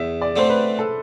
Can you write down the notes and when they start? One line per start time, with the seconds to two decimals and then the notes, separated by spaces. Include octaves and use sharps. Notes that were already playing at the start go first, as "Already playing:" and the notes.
Already playing: E2 E5
0.22 D5
0.36 D3 A3 C4 C5
0.50 B4
0.79 A4